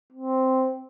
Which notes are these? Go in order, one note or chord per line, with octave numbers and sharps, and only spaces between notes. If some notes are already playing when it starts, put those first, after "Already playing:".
C4